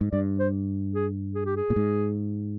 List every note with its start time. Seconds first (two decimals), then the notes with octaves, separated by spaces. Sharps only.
0.01 G#2
0.12 G2 D5
0.40 C5
0.94 G#4
1.35 G#4
1.46 G4
1.56 G#4
1.70 A#2
1.76 G#2